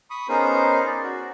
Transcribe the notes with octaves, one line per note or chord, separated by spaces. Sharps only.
B5 C#6 D#6
B3 C#4 D#4 G#4 A#4 C5
D5
F#4